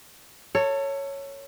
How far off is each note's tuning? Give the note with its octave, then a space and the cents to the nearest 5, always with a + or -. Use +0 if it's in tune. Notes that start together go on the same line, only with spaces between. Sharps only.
A4 +30 C#5 +0